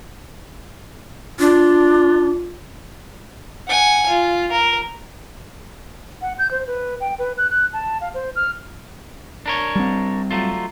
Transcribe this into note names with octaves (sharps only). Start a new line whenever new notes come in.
D4 F4
F#5 G#5
F4
A#4
F#5
G6
C5
B4
G5
B4
F#6
F#6
A5
F5
C5
F6
D4 A#4 C#5
G3 C4
F#3 A3 F4